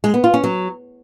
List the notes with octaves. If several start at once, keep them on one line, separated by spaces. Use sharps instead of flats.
G#3
B3
F4
C#4
F#3